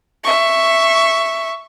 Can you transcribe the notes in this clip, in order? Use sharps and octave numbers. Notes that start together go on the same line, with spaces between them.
E5 C#6